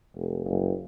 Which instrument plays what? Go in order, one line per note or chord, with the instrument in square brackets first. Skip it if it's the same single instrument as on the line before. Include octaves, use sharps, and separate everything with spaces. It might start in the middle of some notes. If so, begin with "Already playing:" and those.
[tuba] F1
F#1